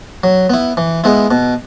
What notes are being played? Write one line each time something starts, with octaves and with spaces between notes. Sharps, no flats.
F#3
B3 E4
E3
G#3 B3 E4
B2